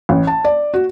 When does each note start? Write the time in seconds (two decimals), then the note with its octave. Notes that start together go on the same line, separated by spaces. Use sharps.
0.09 A1
0.27 A5
0.44 D5
0.74 F#4